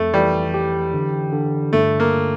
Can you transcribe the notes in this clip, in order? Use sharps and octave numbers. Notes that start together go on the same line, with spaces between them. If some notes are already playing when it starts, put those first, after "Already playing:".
Already playing: F2 A3
E3 G3
G4
D3
D3
G2 A3
A#3